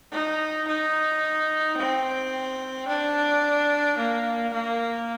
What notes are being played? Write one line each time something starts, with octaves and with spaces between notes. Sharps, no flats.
D#4
D#4
C4
D4
A#3
A#3